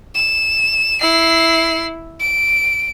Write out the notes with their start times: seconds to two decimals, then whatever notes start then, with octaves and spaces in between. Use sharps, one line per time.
0.15 E7
1.01 E4 C7
2.20 D7